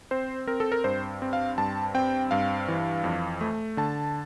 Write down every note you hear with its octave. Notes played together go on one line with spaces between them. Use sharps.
C4 C5
C4 A#4
A4
A#4
G2 C5
C4
F5
G2 A5
C4 G5
G2 F5
E3
F2
A3
D3 A5